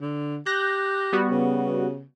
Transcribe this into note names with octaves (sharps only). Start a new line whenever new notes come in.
D3
G4 F#6 G6 A#6
G3 B3 F#4
C#3